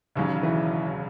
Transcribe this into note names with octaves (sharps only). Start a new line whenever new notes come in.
E1 D#2 C#3 F#3 C#4
E3